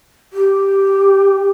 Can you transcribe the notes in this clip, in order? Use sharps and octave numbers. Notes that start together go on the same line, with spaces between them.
G4